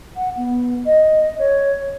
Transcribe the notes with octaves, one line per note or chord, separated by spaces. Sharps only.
F#5
B3
D#5
C#5